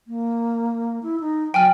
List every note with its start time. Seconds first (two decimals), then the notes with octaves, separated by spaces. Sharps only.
0.07 A#3
1.03 E4
1.20 D#4
1.54 F#3 G5 G#5 F6